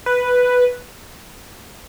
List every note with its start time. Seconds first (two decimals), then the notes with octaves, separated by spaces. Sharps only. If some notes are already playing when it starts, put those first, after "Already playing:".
0.06 B4